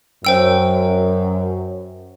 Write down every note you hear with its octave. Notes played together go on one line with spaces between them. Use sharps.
F#2 C5 G5 E6